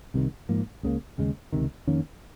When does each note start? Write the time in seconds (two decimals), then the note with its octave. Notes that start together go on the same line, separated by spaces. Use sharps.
0.14 C2 C3 D#3
0.49 G#2 F3 A#3
0.83 C#2 C#3 F#3 A#3
1.18 D#2 C#3 G#3
1.52 C#2 C3 D#3
1.87 F2 D#3 A#3 C#4